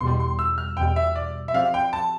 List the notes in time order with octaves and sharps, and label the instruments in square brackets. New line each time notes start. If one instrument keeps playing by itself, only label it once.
[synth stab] E2 B2 G3 [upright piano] C6
[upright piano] C6
E6
F6
[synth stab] E2 B2 G3 [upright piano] G5
[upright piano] E5
D5
E5
[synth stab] F3 C4 G4 D5 [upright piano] F5
[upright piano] G5
A5